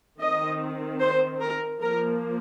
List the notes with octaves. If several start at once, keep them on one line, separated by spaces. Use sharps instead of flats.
D#3 C4 D#5
C5
A#4
F3 A#3 A#4